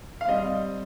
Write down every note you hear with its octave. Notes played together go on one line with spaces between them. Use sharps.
F5
G3 C4 D#5